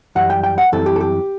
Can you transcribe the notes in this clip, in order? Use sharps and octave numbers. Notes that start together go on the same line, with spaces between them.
F#2 E3 G3 F#5
G5
G5
F#5
F#2 E3 G3 C4 A4
G4
A4
G4